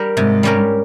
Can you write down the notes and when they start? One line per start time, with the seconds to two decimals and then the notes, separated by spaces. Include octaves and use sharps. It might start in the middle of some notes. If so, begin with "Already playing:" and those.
Already playing: G3 G4 A#4
0.17 G#2 C3
0.43 G3 C#4 G4 A#4